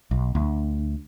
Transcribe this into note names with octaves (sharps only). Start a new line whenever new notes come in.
B1
D2